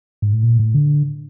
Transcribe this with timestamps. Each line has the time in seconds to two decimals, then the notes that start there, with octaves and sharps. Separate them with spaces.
0.22 G#2
0.33 A2
0.43 A#2
0.59 A2
0.75 D3